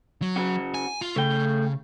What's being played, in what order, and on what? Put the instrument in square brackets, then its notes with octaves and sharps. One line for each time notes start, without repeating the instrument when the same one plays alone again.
[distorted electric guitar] F#3
[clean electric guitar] C#3 F#4
[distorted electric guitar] G#5
F4
[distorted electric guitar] C#3 [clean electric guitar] A3 G5